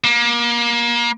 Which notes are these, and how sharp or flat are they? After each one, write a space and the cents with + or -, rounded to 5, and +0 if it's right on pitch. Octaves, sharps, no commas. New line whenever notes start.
A#3 +30